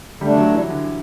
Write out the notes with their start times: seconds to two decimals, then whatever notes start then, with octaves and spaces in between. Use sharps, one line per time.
0.21 D3 G3 A3 D4
0.37 F#3
0.53 E3
0.70 D3